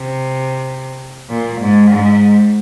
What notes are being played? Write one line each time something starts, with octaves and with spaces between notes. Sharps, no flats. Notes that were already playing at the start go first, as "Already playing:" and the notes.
Already playing: C3
A#2
G#2
G#2